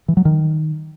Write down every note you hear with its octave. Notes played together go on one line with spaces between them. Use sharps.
E3
F#3
D#3